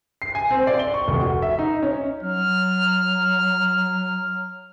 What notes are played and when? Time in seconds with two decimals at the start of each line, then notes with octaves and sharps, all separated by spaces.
0.22 C7
0.35 G#5
0.51 C4
0.67 D5
0.79 G7
0.94 C#6
1.08 F1
1.21 F#4
1.42 E5
1.59 D#4
1.83 C#4
2.23 F#3 F6